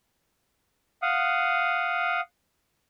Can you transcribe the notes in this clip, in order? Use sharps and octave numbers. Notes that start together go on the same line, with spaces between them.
F5 F#5 D#6